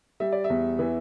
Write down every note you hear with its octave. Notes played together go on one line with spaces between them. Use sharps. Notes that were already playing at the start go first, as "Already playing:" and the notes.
G3 E5
D5
E5
E2
E3